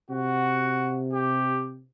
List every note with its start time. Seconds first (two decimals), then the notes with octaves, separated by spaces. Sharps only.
0.10 C3 F#4
1.13 G4